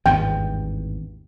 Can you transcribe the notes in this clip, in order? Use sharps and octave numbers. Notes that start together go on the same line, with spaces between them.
G#1 E2 G2 G5